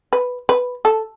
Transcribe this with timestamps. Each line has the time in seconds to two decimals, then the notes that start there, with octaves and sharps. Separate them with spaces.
0.13 B4
0.49 B4
0.85 A4